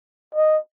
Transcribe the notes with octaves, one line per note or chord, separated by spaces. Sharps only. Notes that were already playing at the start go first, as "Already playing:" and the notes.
D#5